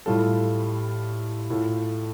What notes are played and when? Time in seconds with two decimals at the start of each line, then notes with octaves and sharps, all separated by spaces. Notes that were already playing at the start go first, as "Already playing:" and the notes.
0.06 A2 G3 F4 A4
1.50 A2 A3 F4 A4